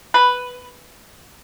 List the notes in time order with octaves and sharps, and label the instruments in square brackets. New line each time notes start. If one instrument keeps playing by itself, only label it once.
[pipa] B4